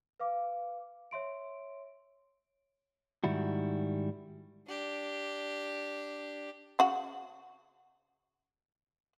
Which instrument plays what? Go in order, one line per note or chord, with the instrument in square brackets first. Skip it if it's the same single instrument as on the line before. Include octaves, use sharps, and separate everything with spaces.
[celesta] B4 F5 D6
C#5 E5 C6 D7
[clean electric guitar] G#2 D#3 G3 E4 F#4
[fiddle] D4 G4
[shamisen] C#3 F#4 F#5